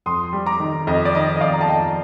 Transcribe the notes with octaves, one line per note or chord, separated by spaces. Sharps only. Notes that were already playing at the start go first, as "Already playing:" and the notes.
F2 C6 D#6
G3
A#5 D6
D#3
F2 D#5
D5
D#3 D#5
D#5
F2 D5 F5
A#5
A5
F2 D#5 G5